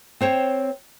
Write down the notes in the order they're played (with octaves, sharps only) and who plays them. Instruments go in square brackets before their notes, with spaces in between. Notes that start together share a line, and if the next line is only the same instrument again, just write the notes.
[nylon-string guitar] C4 C5 C#5 G5